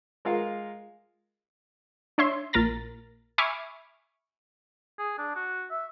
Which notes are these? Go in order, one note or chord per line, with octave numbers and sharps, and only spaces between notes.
G#3 F4 A#4 F5
D4 C#5 E5 C6
A#1 A#2 A#4 A#5 A6
E5 G#5 B5 C#6 D6 F6
G#4
D4
F#4
E5